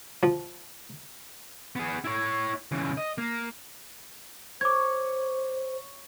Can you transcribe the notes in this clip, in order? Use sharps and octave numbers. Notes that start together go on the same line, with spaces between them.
F3
B3 G#4
E4 C#5
C#3 E3
D#5
A#3
C5 C#5 D6 G#6